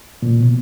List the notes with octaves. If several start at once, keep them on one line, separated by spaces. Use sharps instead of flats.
A#2
B2